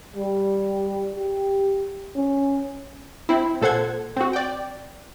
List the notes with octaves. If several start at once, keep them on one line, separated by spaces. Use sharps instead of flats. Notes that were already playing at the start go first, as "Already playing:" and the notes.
G3
G4
C#4
C4 E4
A#2 A4 C5 F#5 G#6
C4 F#4
D5 G5